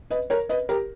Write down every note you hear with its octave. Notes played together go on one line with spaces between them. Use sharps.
B4 D#5
A#4 C#5
B4 D#5
G4 A#4